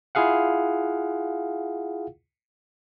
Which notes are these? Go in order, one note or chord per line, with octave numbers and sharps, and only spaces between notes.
E4 F4 G#4 F5 F#5